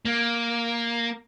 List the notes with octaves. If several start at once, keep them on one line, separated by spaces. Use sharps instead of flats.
A#3